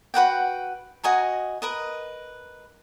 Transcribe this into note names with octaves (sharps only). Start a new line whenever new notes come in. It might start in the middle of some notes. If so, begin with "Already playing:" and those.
F#4 B4 F#5 G5
F#4 D#5 G#5 A#5
A#4 B4 D#5